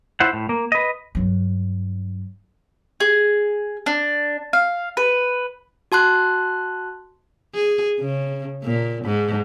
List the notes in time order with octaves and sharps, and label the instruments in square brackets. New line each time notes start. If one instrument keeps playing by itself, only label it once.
[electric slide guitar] E4 C5 F#5
A2
A#3
B4 D#5
[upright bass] G2 F#3
[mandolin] G#4
D4
F5
B4
[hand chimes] F#4 A5 C6 F#6
[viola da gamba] G#4
C#3
A#2
G#2